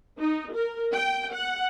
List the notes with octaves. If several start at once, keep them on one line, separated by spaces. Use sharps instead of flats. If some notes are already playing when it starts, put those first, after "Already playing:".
D#4
A#4
G5
F#5